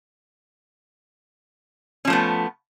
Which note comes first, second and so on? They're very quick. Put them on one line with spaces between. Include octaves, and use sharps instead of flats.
C#4 F3 A3 B3